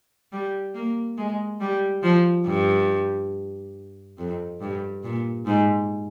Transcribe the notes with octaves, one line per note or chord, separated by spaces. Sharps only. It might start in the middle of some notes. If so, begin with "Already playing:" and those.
G3
A#3
G#3
G3
F3
G2
F2
G2
A#2
G#2